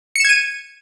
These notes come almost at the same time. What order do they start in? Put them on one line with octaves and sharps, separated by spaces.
C#7 E7 G#6 D#7